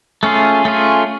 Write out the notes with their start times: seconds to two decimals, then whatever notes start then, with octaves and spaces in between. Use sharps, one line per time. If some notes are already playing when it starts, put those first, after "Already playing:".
0.23 A3 C#4 F4 G#4
0.65 A3 C#4 F4 G#4